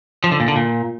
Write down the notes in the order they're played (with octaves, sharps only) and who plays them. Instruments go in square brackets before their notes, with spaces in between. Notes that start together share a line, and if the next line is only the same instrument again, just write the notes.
[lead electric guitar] F3
D3
A#2
D3
A#2